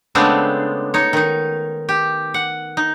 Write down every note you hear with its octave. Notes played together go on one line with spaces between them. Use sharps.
C#3 G#3 A3 B3 C4 D4
D#4 C#5
D#3 D#4
G4
F#5
D#4